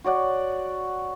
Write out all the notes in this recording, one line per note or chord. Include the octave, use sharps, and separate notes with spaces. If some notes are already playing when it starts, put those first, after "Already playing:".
F#4 C#5 D5 F#5